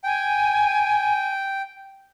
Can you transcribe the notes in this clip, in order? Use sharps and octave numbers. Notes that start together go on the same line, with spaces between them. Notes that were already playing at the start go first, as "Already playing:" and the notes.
G5 G#5